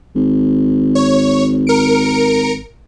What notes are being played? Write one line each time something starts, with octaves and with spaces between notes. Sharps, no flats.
G#1
C#5
A#4 C#7 D7